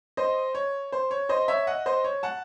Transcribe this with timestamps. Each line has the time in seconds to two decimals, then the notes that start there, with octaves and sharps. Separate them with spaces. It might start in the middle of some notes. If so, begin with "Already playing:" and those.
0.17 C5 D#5
0.55 C#5
0.92 C5
1.11 C#5
1.29 C5 D#5
1.48 C#5 E5
1.67 D#5 F#5
1.86 C5 D#5
2.04 C#5
2.23 F#5 A5